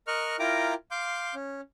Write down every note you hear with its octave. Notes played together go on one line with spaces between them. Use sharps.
A#4 D#5 C#6 F6 F#6
E4 F4 A#4 G5 A#5 D6
F5 C6 D6 G6
C#4